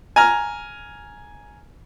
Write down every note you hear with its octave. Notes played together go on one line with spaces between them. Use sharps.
G#5 A#5 F6